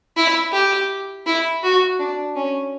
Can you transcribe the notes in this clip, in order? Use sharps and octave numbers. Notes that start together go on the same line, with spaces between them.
E4
G4
E4
F#4
D4
C#4